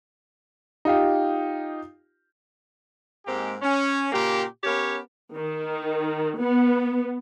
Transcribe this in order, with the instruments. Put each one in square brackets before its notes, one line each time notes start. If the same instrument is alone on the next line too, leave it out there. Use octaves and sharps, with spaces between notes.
[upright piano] D#4 F4 G4
[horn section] G#2 G#3 A#3 C4 G4
C#4
A#2 C#3 A#3 G4
B3 C#4 G4 A#4 C#5
[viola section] D#3
B3